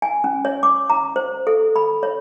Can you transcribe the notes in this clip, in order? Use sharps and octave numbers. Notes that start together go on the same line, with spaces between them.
G#5
C#4
C#5
D6
A#5
C5
A4
B5
C#5